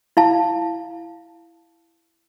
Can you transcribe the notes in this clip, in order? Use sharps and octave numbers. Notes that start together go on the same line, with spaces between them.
E4 F5 A5